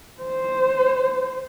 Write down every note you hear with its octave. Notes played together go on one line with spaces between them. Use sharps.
C5